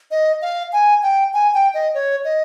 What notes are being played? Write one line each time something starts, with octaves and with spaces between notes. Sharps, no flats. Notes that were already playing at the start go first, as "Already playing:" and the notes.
D#5
F5
G#5
G5
G#5
G5
D#5
C#5
D#5